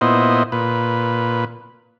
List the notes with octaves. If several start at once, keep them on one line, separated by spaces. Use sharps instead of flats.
A#2 B3 E4 C5 D#5
A#2 B4